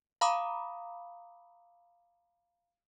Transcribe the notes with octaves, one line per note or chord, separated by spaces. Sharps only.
F5 A#5 B5 D6 D#6